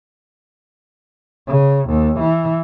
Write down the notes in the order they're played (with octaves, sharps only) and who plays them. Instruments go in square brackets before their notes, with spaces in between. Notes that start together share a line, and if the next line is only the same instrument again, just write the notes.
[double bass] C#3
D#2
E3